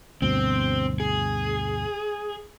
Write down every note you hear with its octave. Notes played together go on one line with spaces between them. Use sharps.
D2 G2 B2 C4
G#4